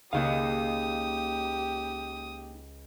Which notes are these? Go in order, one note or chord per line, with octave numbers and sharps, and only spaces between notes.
C#2 A#3 D#4 G4 F5 D#6 F#6